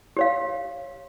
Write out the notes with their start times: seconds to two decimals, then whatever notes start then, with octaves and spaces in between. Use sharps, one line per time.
0.17 G4 C#5 F5